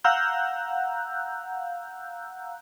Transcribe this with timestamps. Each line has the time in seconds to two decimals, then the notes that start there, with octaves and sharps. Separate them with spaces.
0.04 F5 F#5 A#5 E6 F#6 G6